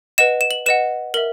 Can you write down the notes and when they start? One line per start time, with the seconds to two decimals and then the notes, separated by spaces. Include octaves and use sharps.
0.18 B4 D#5 F#5 E7
0.41 E7
0.51 F#7
0.66 B4 D#5 F#5 E7
1.14 A#4 E5 F#7